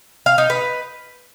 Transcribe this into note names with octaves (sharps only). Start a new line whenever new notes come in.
F5
D#4
B4